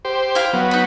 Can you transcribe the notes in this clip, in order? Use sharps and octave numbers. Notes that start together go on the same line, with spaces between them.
G4 C5
E4 F5 G5
F#3 B3
D#4 B5